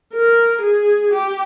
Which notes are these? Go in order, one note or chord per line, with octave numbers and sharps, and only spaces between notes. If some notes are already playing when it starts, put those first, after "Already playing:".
A#4
G#4
G4